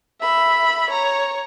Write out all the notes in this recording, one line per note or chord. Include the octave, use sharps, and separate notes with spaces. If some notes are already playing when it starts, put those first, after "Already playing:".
E5 B5
C#5 A#5